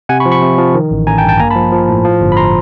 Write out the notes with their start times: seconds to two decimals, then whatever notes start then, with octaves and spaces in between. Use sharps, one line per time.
0.09 C3 F#5 G#5
0.20 B5 C#6
0.26 F3
0.31 B5 C#6
0.42 C3
0.58 F3
0.75 D#3
0.91 A1
1.07 A1 G#5 A#5
1.18 G5 A5
1.23 G2
1.29 G5 A5
1.39 A#3 G#5 A#5
1.51 A5 B5
1.56 F3
1.72 F3
1.88 A2
2.05 F3
2.21 G1
2.32 B5
2.37 A#5 C6